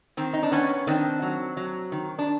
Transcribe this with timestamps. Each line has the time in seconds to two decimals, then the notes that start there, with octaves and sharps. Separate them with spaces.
0.17 D#3 C4
0.33 D#4
0.43 D4
0.52 D#3 B3 C#4
0.87 D#3 C4 D4
1.22 F#3
1.57 F#3
1.92 D#3
2.19 D4